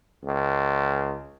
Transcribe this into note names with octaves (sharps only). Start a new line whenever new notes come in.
C#2